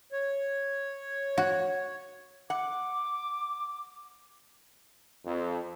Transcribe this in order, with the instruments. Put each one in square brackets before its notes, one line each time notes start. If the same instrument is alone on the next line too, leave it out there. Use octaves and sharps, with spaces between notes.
[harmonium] C#5
[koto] F#4
[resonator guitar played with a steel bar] F#5 [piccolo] D6
[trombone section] F2